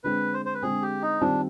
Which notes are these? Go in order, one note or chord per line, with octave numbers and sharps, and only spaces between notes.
D3 G#3 C4 B4
C5
C5
B4
D3 G#3 C4 G#4
G4
D#4
D#3 G3 C4 D4 F4